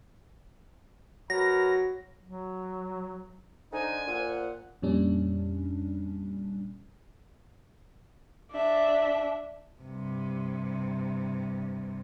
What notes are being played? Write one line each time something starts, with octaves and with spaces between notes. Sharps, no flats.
F#3 A#4 B4 A#5 A#6
F#3
D3 D#4 C5 G#5
A#2 F#5
F2 A#2 G3 C#4 D4
D4 E5
G2 C3